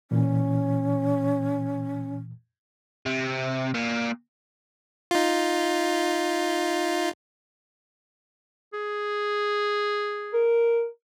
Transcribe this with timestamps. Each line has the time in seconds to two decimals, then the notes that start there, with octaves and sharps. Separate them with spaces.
0.11 A#2 E3 C#4
3.06 C3
3.75 A#2
5.11 D#4 F4
8.73 G#4
10.34 A#4